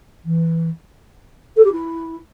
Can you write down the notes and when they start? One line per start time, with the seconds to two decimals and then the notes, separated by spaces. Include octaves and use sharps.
0.25 E3
1.57 A4
1.65 G4
1.72 E4